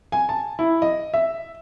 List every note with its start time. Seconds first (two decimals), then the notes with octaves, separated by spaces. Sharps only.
0.12 G#5
0.29 A5
0.59 E4
0.82 D#5
1.14 E5